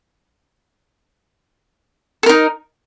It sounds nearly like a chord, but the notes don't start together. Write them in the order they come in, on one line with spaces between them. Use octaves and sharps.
A4 A#4 D#4